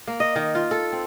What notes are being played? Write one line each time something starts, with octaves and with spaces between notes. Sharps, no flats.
A#3
D#5
D#3
F4
A4
C4